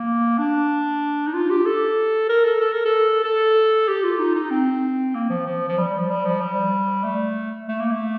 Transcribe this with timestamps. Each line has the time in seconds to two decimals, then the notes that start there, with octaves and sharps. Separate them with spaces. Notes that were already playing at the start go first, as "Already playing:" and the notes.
Already playing: A#3
0.38 D4
1.27 D#4
1.34 F4
1.50 G4
1.66 A4
2.29 A#4
2.45 A4
2.60 A4
2.73 A#4
2.85 A4
3.24 A4
3.88 G4
4.04 F4
4.19 D#4
4.35 D#4
4.51 C4
5.15 A#3
5.30 F3
5.46 F3
5.68 F3
5.78 G3
5.98 F3
6.10 G3
6.25 F3
6.41 G3
7.04 A3
7.68 A3
7.79 A#3
7.91 A3